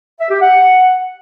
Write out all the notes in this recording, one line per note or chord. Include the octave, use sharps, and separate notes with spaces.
E5
G4
F#5